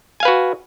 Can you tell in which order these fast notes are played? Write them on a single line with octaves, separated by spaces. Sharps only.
G#5 F5 B4 F#4